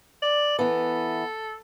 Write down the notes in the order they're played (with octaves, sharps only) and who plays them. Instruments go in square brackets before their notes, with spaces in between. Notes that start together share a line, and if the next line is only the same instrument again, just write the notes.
[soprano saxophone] D5
[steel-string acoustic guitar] E3 B3 [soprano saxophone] A4